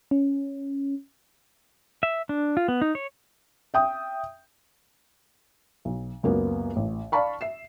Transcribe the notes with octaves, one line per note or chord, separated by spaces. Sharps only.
C#4
E5
D4
F4
B3
D#4
C#5
E5 G5 D#6
B1
C#2 F#2 A#3 B3
A1
D5 F5 A5 B5 C#6
E5 C7 E7